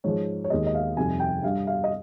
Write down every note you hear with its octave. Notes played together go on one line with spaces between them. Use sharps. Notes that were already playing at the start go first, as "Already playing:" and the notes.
G#2 F3 G#3 C#5
C#5
D#2 D#3 G#3 D#5
D#5
F5
F2 C3 D#3 G3 G#5
G5
G2 G3 F5
F5
D#5